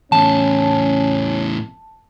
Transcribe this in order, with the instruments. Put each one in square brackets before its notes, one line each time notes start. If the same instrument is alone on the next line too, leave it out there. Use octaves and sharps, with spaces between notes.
[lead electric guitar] E2 A2 [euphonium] C#4 [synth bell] A5